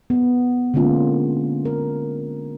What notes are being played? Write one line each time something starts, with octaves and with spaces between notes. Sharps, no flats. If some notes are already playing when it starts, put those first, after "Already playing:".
B3
D3 G#3 A#3 C#4 F4
A#4